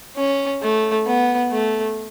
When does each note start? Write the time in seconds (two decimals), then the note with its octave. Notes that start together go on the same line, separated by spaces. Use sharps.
0.17 C#4
0.62 A3
1.06 B3
1.51 A3